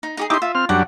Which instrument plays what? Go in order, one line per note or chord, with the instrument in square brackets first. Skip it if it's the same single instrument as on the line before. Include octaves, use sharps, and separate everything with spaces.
[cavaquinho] D#4
D#4 G4 G#4
[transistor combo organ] D#4 E4 G4 [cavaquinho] C6 D6
[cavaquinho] F4 [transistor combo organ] E5
[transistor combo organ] C4 F6
[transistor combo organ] F#2 G3 D4 [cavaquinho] F#5